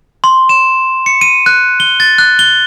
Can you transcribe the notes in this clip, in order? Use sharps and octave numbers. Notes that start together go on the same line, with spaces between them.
C6
E7
C#7
D#7
F#6
G7
A6
F#6
G7